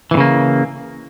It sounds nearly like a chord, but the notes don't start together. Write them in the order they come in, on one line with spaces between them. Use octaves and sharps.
E3 A2 C#3 A#3